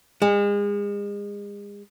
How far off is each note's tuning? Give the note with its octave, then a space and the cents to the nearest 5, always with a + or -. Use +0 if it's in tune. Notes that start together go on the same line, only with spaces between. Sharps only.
G#3 -35